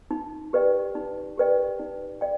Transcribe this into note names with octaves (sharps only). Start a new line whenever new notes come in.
D#4
G4 B4 D5 G5
D#4
G4 B4 D5 G5
D#4
D5 G5